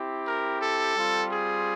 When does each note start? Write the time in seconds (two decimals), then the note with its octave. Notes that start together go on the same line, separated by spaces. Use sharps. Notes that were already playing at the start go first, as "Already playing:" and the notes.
Already playing: C4 E4 G4
0.27 A#4
0.62 A4
0.96 G3 C4 F4
1.31 G#4